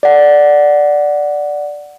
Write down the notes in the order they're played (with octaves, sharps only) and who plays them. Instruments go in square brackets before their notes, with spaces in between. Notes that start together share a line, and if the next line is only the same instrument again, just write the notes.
[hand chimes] D5 F#5